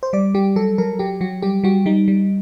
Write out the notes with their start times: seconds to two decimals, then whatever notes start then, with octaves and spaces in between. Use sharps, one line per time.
0.03 C5
0.13 G3 D5
0.34 G3 G4
0.56 F#3 A4
0.78 F#3 A#4
0.99 F#3 G4
1.21 F#3 F#4
1.42 G3 G4
1.64 G3 F#4
1.86 G3 D#4
2.08 G3